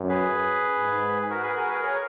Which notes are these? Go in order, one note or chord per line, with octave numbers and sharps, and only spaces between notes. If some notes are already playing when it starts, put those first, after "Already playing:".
Already playing: F#2
G#4 B4
G#2
F#4 A#4
G#4 B4
F#4 A#4
G#4 B4
A#4 C#5